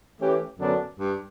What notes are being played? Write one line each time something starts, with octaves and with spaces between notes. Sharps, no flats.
E3 A3 C#4 G4
F#2 D3 F#3 B3 D4
G2